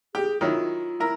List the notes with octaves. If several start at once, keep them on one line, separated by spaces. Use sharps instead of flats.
G4 G#4
D#3 F#3 E4 F4
E4 A#4